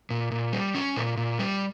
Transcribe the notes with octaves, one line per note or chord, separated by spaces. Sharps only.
A#2
A#2
G3
C#4
A#2
A#2
G3